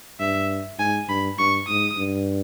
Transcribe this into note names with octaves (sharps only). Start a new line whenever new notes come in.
G2 E5
G#2 G#5
G2 B5
G2 C#6
G#2 D#6
G2